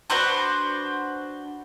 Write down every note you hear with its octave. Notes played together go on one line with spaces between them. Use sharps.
D4 F#4 B4 C5